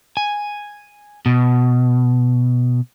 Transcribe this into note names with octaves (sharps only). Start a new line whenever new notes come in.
G#5
B2